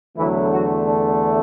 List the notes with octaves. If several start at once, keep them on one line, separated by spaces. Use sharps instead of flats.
E2 D3 E3 F#3 A3 E4
F#3 F#4
D4